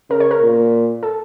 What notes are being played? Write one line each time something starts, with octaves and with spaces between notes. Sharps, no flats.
C#3 A#4
C#5
A#4
A#2
A4